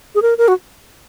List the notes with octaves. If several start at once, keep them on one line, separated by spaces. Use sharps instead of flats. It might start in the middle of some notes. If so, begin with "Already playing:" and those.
G#4
A#4
A#4
F#4